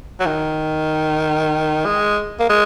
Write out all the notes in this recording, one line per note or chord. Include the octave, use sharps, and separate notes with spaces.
F#3
D#3
G#3
A#3
G#3